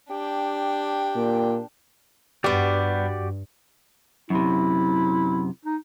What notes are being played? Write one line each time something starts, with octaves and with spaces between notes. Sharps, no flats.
D4 G4 G5
A#2
G2 G3 B3 F#4 G4 D5
F#2 C3 E4
D#4